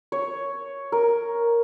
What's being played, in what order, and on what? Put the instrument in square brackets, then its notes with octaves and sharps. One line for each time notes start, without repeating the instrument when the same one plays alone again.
[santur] C#5
A#4